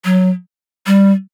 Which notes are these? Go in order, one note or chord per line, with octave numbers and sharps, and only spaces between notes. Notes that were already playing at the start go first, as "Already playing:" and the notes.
F#3
G3